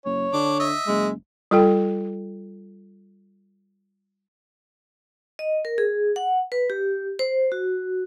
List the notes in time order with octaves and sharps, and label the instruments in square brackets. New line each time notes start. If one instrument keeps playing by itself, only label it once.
[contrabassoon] F#1 [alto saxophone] C#5
[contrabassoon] D3 [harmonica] D4 D6
[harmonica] D#5 E5
[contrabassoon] F#1 [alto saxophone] G#3
[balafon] G3 F4 A4 G5
[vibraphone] D#5
A#4
G#4
F#5
B4
G4
C5
F#4